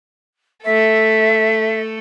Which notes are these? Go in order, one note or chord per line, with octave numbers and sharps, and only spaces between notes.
A3 A4 E5